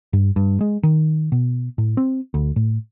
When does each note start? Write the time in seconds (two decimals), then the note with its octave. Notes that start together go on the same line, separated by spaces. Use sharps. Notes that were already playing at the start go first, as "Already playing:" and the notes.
0.13 G2
0.36 G2
0.61 G#3
0.83 D#3
1.32 B2
1.78 A2
1.97 C4
2.34 D2
2.56 A2